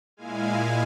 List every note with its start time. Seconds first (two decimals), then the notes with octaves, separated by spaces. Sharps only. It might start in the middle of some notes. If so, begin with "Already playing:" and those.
0.17 A#2 G#3 E4 F5 G#5